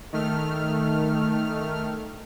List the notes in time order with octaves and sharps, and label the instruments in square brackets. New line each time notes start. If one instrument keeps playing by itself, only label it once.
[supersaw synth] D#3 A3 F6